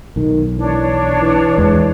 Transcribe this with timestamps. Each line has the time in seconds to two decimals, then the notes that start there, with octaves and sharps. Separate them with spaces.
0.16 B1 D#3
0.57 E3 D4 C#5
1.22 E3
1.58 E2 G#3